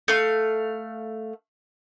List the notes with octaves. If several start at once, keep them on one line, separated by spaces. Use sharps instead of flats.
A3 F5